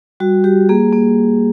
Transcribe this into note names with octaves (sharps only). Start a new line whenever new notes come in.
G3 F#4
G3 G4
A#3 G#4
A#3